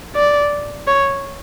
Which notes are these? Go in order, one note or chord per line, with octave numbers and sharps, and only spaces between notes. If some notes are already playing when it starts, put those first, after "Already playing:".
D5
C#5